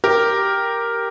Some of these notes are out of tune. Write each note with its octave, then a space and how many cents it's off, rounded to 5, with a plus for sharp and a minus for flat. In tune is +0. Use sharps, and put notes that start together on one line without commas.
G4 +0 A#4 +0